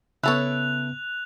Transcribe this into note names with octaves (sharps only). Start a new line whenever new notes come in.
C#3 B3 E4 A4 C#5 F#6 F7